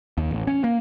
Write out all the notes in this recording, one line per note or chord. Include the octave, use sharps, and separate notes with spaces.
D#2
A1
C#4
A#3